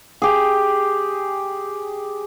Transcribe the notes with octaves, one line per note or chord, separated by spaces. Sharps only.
G4 G#4